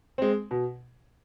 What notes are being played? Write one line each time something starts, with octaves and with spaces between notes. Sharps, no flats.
G#3 C4
B2